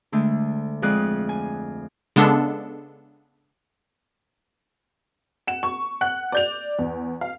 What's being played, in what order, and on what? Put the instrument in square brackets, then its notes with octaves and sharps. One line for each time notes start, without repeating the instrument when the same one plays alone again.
[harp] D2 D3 G#3 A3
F2 F3 G#3 G#4 D5 F#6
G#5
[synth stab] C#3 G#3 B3 D4 A4
[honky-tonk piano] F#5 E7
C#6
F#5 F#6
D5 G6 F7
E2
F5